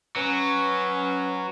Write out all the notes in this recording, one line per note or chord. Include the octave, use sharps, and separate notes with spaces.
F#3 C#4 B4